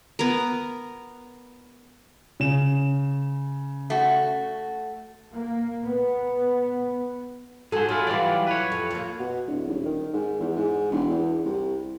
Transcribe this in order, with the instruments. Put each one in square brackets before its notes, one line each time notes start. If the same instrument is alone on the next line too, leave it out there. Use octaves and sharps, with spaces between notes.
[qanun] B3 A#4
[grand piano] C#3 E7
[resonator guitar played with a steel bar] A3 F#4
[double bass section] A#3
B3
[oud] G#2 F#3 A4 [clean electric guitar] G#4 C5
[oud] F#3 [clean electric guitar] E4 F4 G#4
[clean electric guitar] E3 G3 D5 [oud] F#3 F4
[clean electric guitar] B4 C#5
[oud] F2
F2 A#3
[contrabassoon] B2
D1
D#1
D#3
G#2
E2
G#2
E1
E2
C2